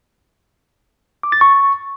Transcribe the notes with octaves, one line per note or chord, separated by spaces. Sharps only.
D6
A6
C#6